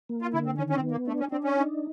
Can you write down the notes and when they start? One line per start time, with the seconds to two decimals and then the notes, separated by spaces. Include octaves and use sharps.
0.09 A#3
0.22 F4
0.34 D3 E4
0.46 C4
0.58 D#3 C#4
0.70 C#4
0.75 C4
0.83 B3
0.91 A#3
1.07 A3 D4
1.20 C#4
1.32 C4 D4
1.44 C#4
1.57 D#4